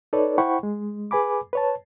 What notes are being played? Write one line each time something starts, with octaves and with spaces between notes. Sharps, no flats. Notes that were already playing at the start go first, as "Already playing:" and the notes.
D#4 A4 B4 C#5 D5
E4 C5 F#5 G5 B5 C#6
G#3
G#4 B4 G#5 B5 D6
B4 C#5 A5